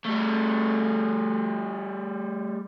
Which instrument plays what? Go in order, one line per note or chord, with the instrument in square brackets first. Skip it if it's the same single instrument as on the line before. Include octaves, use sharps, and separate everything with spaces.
[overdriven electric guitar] G3 A3